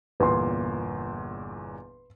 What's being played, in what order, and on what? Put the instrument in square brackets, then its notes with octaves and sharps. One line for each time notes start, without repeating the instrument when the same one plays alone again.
[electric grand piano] G1 E2 A#2 [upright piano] B4 C6